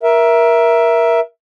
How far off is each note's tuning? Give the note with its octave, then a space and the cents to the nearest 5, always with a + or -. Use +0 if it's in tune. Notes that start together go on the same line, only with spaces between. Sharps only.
A#4 +20 E5 +5